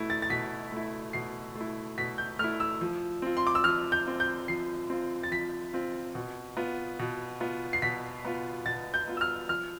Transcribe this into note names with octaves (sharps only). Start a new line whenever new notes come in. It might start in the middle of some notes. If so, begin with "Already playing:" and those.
Already playing: B2 A3 E4
A6
A6
B2 B6
A3 E4
B2 C7
A3
E4
B2 B6
G6
A3 E4 F6
E6
F3
C4 F4
C6
D6
E6
F3 F6
G6
C4 F4
G6
F3 C7
C4 F4
A6
F3 B6
C4 F4
B2
B3 F4
B2
B3 F4
C7
B2 B6
B3 F4
B2 A6
G6
B3 F4
E6
F6
F3 F6